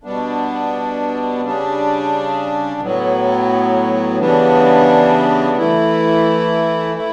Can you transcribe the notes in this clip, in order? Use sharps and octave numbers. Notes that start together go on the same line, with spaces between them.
B2 G3 B3 D4
C#3 G3 D4
A2 F#3 B3
C#3 E3 G3 B3 D4
E3 A3 E4
A3 E4